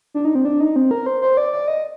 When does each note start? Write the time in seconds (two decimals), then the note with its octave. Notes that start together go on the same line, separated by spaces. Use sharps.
0.14 D4
0.25 D#4
0.35 C4
0.45 D4
0.60 D#4
0.76 C4
0.91 A#4
1.06 C5
1.22 C5
1.37 D5
1.52 D5
1.68 D#5